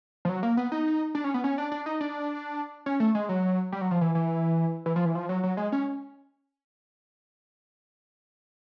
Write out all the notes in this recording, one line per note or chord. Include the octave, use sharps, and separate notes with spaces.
F3
F#3
A#3
B3
D#4
D4
C#4
B3
C#4
D4
D4
D#4
D4
C#4
A3
G#3
F#3
G3
F#3
F3
E3
E3
E3
F3
E3
F3
F#3
F#3
G#3
C#4